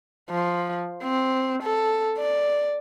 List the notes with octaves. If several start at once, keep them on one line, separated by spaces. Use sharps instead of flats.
F3
C4
A4
D5